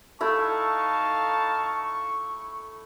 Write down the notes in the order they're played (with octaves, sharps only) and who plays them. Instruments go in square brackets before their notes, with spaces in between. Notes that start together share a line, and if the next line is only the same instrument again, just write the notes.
[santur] A3 E4 E5 [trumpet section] D#4 F5 A5 [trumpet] C#6